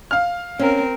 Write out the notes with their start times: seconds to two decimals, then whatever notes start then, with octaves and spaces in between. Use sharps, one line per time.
0.11 F5 F6
0.59 C4 C#4 A#4